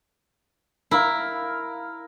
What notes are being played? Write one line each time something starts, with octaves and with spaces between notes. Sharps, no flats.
E4 A#4 F5